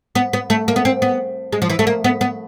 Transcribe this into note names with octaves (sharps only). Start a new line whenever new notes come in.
B3
B3
A3
A#3
B3
C4
B3
G#3
F3
E3
A3
A#3
B3
B3